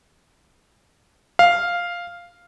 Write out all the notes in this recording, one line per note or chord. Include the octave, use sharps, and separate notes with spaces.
F5